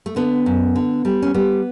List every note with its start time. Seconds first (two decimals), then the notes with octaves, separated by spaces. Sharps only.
0.06 A3
0.16 D3 B3
0.46 F#2
0.76 D3
1.05 G3
1.22 C#4
1.34 G3 B3